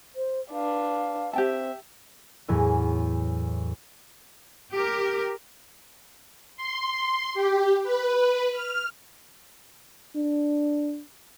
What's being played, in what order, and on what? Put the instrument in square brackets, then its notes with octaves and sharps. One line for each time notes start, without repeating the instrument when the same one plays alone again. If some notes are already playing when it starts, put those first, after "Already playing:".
[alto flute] C5
[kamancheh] D4 B4 [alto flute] F5
[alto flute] C4 [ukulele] G4 G5 A5 [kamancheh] E5
[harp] E2 A2 F#3 E4 G#5 E6
[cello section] G4 A#4
[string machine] C6
G4
B4
F6
[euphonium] D4